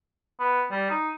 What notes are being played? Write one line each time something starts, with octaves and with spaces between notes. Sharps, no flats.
B3
G3
D#4